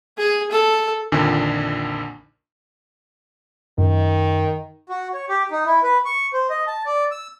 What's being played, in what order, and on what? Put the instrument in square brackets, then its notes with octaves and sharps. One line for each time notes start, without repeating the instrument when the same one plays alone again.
[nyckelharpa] G#4
A4
[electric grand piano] A#1 F2 D3 D#3 D4 G#5
[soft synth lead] F#2 [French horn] D#3
[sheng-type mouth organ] F#4
C#5
G4
D#4
E4
B4
C#6
C5
D#5
A5
D5
E6